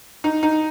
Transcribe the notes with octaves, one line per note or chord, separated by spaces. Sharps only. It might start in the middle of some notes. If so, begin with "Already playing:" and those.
D#4
D#4